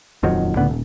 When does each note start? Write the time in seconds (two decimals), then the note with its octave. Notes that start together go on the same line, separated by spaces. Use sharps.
0.23 D#1 F2 D#3 F#3
0.56 C#2 A2 D3 B3
0.69 D#1